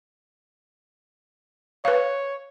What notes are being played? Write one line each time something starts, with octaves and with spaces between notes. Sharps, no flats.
B4 C#5 F5